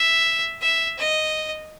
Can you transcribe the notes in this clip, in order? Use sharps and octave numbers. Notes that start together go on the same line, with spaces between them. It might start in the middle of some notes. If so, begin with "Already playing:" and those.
Already playing: E5
E5
D#5